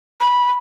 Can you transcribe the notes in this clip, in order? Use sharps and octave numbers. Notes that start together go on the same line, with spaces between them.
B5